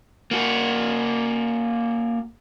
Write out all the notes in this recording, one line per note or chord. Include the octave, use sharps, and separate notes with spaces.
A#3 F#4